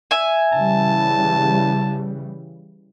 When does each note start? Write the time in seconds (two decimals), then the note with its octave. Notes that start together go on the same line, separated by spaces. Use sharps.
0.11 E5 G#5
0.53 C#3 E3 G3 A5